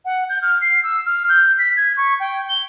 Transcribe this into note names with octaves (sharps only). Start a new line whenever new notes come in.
F#5
G6
F6
C7
E6
F6
G6
B6
G#6
C#6
G5
G7